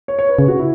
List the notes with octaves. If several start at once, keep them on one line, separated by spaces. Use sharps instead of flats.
C#5
C#5
B4
C#3 G#4
F#4
E4